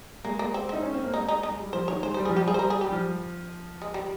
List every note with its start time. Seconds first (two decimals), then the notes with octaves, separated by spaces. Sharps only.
0.25 G#3 A#3
0.39 A#3
0.54 C4
0.69 C4 D#4
0.83 C#4
0.93 C4
1.04 A#3
1.14 G#3 D#4
1.28 D#4
1.43 G#3 D#4
1.59 G3
1.73 F3 C5
1.88 D#3 C#5
2.03 G#3 C5
2.14 G3 C5
2.25 G#4
2.29 F3
2.36 G4
2.42 G3
2.48 G#4
2.54 C5
2.59 A#4
2.70 G#4
2.81 G3 G4
2.92 F3
3.82 G#3
3.94 G3